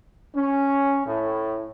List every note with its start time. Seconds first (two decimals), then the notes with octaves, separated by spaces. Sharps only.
0.35 C#4
1.06 A2